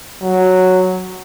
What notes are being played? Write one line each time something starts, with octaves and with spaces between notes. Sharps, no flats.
F#3